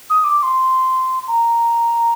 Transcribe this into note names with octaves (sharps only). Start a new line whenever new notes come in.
D#6
D6
D6
C6
A#5